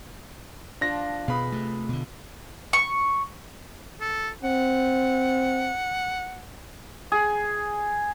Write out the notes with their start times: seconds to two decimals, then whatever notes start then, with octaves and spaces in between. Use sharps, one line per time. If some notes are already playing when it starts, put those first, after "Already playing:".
0.81 F3 D4 A#6
1.28 B2 G#4 B4 D#5 F5 B5
1.52 C3 A3
1.89 B2 D3
2.73 C#6
4.01 A4
4.44 C4 F#5
7.12 G#4